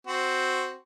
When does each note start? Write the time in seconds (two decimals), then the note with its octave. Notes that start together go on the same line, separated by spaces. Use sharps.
0.07 C4 F#4